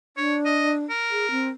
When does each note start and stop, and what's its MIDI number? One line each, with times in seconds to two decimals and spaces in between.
0.17 0.83 62
0.17 0.36 73
0.45 0.72 75
0.90 1.49 70
1.11 1.29 68
1.31 1.49 60